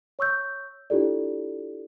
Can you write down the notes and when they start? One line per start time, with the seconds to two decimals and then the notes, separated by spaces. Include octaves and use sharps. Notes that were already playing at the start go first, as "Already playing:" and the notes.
0.19 C#5 C#6 E6 G6
0.90 D4 E4 F4 G4 A4 D5